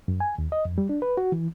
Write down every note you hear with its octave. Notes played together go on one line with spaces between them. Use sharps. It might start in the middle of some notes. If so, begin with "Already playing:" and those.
F#2
G#5
D#2
D#5
F2
G3
D4
B4
F#4
E3